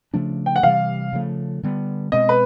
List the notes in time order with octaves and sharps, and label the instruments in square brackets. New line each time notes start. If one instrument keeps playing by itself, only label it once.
[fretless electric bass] C#3 F3 A3 D4
[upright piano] G5
F#5
[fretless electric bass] C3 E3 G3 [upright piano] F5
[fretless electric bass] C#3 F3 A3
D3 G3 B3
[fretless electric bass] B2 G#3 C4 [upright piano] D#5
[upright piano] B4